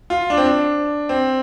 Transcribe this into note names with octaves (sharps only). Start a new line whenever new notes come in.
F4
D4
C4
D4
C4